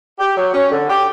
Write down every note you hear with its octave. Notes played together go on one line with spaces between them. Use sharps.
G4
F#3
C#4
D3
G4